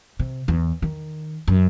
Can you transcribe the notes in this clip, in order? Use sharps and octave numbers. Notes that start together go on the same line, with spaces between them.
C3
E2
D#3
F#2